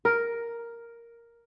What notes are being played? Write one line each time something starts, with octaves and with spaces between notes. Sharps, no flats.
A#4